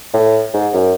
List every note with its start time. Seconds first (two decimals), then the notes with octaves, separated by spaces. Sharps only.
0.13 A2
0.54 G#2
0.73 F#2